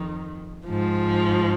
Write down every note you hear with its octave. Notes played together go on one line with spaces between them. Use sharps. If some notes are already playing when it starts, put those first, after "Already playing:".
Already playing: F2 D#3
G#2 F3